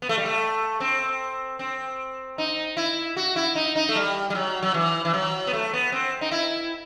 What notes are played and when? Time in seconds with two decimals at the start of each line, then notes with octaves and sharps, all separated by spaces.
0.02 B3
0.09 A3
0.18 G3
0.26 A3
0.80 C4
1.59 C4
2.38 D#4
2.77 E4
3.17 F#4
3.36 E4
3.56 D#4
3.76 D#4
3.89 A3
3.96 G3
4.30 G3
4.35 F#3
4.63 F#3
4.74 E3
5.05 E3
5.14 F#3
5.47 B3
5.53 A3
5.73 B3
5.92 C4
6.21 D#4
6.31 E4